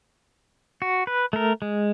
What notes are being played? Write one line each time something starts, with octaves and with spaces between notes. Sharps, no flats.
F#4
B4
A3 A#4
G#3